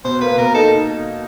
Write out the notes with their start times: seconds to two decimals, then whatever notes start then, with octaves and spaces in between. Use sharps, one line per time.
0.05 B2 C5
0.21 A#3 B4
0.38 B2 A#4
0.54 D#4 A4